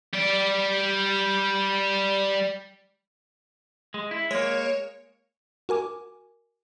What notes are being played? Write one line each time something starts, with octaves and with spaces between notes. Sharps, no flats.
G3 D5
G#3
E4
G#3 A#3 C#5
F#4 A#4 G#5 D6